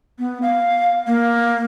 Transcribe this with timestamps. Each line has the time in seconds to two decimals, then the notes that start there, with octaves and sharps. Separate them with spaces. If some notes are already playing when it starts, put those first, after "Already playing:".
0.19 B3
0.42 F5
1.07 A#3